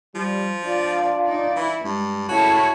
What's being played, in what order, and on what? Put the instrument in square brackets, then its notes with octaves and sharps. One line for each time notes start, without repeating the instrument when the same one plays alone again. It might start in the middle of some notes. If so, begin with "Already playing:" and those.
[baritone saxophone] F3 [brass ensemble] G3
[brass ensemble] D4 F4 [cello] D5
[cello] D#4 D5
[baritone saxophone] E3 [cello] E4
[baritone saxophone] G2 [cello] G#3
[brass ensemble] A2 C#3 [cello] E4 C#5 [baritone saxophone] F#4 [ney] A5